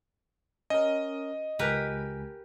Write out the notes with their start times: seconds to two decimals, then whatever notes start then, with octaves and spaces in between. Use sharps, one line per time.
0.70 C#4 A#4 D#5
1.59 C#2 G4 A#4 B4 G#5